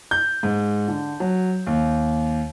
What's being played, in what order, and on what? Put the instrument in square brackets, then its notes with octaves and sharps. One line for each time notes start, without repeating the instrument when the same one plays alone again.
[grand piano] G6
G#2
D3
F#3
D#2